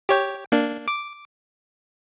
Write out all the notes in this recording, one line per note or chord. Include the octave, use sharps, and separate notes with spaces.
G4 C#5 G5
A#3 D4
D6